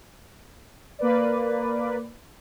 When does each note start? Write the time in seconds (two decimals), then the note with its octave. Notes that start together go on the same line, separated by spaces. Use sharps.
0.99 A#3 B4 D5